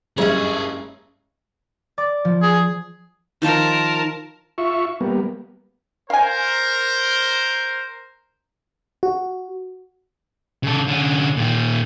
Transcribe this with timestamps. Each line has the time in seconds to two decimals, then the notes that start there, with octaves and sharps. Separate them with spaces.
0.18 F#1 G2 G#3 C#4 G#4 A4 C#5 E5
1.98 D5 D6
2.25 F3
2.42 G#4
3.42 D#3 F3 F4 A#4 A5
4.58 F4 E5 C#6
5.01 G3 A#3 B3
6.10 A#4 C5 F5 G#5
9.03 F#4
10.63 C#3 A4
10.88 D3 C#4
11.37 A#2 D#3